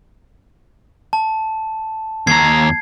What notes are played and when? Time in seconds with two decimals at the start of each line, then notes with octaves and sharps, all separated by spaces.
1.13 A5
2.27 D#2 A#5 G#6 C7